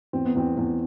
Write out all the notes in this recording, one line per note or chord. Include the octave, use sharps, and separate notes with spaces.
E2 C4
B3
E2 C4
E2